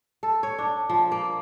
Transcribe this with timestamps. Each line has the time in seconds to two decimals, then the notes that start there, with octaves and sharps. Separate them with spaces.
0.23 A4
0.43 C#5
0.58 D4
0.90 F3
1.12 A#3